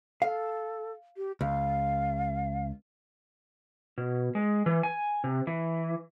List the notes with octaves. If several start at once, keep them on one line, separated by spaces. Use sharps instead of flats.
A4 F5
G4
C#2 F5
B2
G#3
E3
G#5
C3
E3